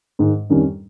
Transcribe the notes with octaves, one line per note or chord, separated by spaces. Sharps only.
G#2 D#3 G#3
F2 D#3 G3 C#4